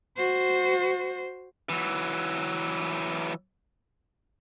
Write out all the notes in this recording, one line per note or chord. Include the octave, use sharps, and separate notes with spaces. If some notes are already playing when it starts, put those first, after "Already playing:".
F#4 C5
E3 F#3